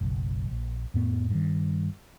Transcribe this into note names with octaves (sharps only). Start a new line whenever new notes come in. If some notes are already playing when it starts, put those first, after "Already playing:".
F#1 B1
A#1
F2 A2 B3
G2 D#3